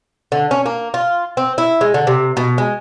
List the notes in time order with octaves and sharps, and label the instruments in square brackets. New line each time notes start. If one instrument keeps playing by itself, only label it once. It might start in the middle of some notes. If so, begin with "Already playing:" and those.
[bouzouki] D3
C#4
A#3
F4
C4
E4
G#3
D3
C3
B2
G#3